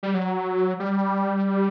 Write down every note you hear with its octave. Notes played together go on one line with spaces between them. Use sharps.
G3
F#3
G3